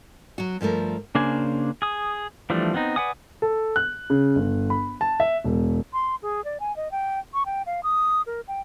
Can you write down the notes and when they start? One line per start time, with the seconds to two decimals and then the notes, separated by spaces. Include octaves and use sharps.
0.38 F#3 F#4
0.61 G2 F3 A3 A#4
1.15 C#3 A#3 D4 C5 G#5
1.82 G#4 D#6
2.50 E3 F3 G3 A3 D4
2.74 B3 C4 D#4
2.96 B4 D5 F#5 G#5 D#6
3.42 A4
3.76 F#6
4.10 C#3
4.36 G1
4.70 B5
5.01 A5
5.20 E5
5.44 E1
5.92 C6
6.22 G#4
6.44 D5
6.60 G#5
6.76 D#5
6.91 G5
7.34 C#6
7.46 G5
7.66 F5
7.83 D#6
8.26 A#4
8.48 G5